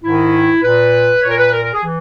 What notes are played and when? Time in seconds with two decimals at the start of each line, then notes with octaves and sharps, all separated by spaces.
0.02 G#2 D#3 E4
0.62 A#2 B4
1.22 A#2 C#5
1.30 A#4
1.37 B4
1.52 A#4
1.63 A#4
1.73 G#4
1.84 E3